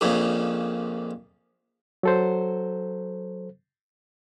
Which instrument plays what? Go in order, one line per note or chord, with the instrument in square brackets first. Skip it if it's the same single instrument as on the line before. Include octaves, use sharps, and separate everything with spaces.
[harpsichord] A#1 F2 A#2 C#3
[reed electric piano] F#3 A4 C5